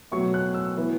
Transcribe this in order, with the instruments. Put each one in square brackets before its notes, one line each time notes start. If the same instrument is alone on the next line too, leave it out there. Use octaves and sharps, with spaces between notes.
[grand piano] B2 F#3 A3 C#6
F#6
E6
E3 B3